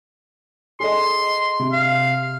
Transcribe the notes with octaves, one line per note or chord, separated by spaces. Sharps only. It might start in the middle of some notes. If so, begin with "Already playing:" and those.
G#4 A4 D#5 C6
C3
F5